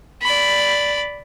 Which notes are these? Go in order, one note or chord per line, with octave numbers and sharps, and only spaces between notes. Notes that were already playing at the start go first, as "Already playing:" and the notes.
D5 B5